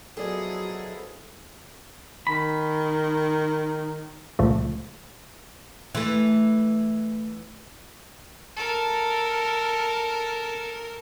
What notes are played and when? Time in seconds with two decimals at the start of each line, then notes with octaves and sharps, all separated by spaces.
0.17 F3 F#3 B3 E4 G#4 A4 D5 D#5
2.27 D#3 B5
4.39 C#2 A#2 F3 A3
5.95 E3 A3
8.56 A4 A#4